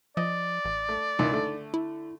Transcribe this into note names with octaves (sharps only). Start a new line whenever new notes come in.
F3 D5 D#5
A1
A3
C#2 D#3 D#4 E4
D3 A3
E4